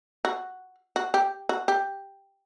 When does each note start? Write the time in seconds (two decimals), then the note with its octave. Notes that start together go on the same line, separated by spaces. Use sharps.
0.25 F#4
0.96 F#4
1.14 G4
1.49 F#4
1.68 G4